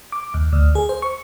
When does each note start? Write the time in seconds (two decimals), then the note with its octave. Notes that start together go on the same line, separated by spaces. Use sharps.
0.12 D6
0.34 D#2
0.53 D2
0.75 G#4
0.89 C5
1.02 C#6